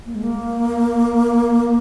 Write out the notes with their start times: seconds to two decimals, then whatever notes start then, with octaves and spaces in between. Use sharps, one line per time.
0.06 A#3
0.15 G#3
0.23 A#3